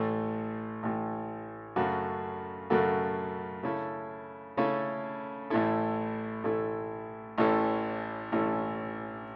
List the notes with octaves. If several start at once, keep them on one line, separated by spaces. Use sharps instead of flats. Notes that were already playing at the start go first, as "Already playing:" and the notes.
Already playing: A1 A2 A3
A1 A2 A3
F#2 C#3 A3 F#4 A4
F#2 C#3 A3 F#4 A4
C#3 A3 C#4 E4 A4
C#3 A3 C#4 E4 A4
A1 A2 A3 E4 A4
A1 A2 A3 E4 A4
A1 A2 E3 C#4 A4
A1 A2 E3 C#4 A4